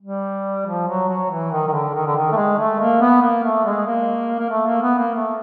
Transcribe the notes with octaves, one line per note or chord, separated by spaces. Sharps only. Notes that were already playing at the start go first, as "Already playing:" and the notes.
G3
F3
F#3
F#3
E3
D#3
D#3
D3
D#3
D3
D#3
A3
G#3
A3
A#3
B3
A#3
A3
G#3
A#3
A#3
A3
A#3
B3
A#3
A3